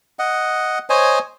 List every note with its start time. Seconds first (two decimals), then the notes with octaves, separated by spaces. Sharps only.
0.19 D#5 F#5
0.90 C5 C#5 D#5 G#5